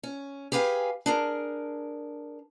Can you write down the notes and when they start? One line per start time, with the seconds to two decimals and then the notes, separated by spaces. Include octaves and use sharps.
0.03 C#4
0.52 G4 G#4 B4 F5 G5 G#5
1.06 D4 G#4 A#4